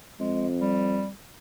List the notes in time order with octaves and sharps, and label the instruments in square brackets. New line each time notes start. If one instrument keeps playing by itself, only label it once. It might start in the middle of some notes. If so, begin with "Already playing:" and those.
[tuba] F2 [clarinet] G#3
[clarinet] G3